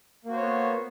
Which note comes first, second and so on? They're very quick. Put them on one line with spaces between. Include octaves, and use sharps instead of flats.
A#3 F#4 C5 C#5 B3